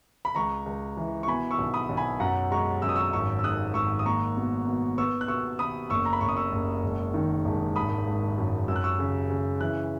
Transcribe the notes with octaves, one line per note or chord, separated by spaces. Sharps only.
B5
C#2 A#5 C#6
C#2
E3
C#6
B2 G#5 B5
C#6 E6
B1
B5 D#6
B1
G#5 B5
F#2 F#5 A#5
G#3 A#5 C#6
F#2 E6
D#6
C#6 E6
G#1 C#6 E6
E6
G#2 D#6 F#6
G#1 C#6 E6
D#6
A#3 A#5 C#6
B2
B2
B3 C#6 E6
F#6
B2 C#6 E6
B2 B5 D#6
F#1 C#6 E6
A#5
B5
F#1 C#6
D#6
C#6 E6
F#1
E1
D#3
E1
G#1 B5 D#6
G#1
F#2
F#2 E6
F#6
C#6 E6
C#3
C#3
E3 F#6